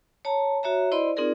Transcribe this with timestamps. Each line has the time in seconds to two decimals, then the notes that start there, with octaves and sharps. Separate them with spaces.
0.25 C#5 A5 A#5
0.63 F#4 C#5 E5 A#5
0.92 E4 C5 D5 D#5 B5 C6
1.16 C4 D#4 F4 G#4 A#4 D5